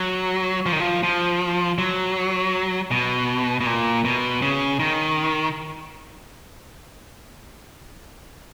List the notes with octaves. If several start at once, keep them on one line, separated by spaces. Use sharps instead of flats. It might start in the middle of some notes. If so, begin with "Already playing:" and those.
Already playing: F#3
F3
D#3
F3
F3
F#3
B2
B2
A#2
B2
C#3
D#3